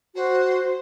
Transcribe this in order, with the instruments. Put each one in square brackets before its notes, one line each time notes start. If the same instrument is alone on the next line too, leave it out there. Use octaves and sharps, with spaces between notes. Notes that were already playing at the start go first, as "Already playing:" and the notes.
[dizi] F#4 [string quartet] C5